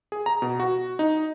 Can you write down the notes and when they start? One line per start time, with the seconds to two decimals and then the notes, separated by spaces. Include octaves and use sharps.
0.12 G#4
0.26 A#5
0.42 B2
0.60 F#4
0.99 D#4